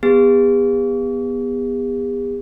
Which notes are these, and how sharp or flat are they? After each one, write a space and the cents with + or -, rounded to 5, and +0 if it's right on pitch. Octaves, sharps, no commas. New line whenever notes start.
B3 +0 G#4 -45